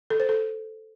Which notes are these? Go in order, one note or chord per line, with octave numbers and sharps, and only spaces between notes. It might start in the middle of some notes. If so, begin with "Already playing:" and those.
A4
C5
A4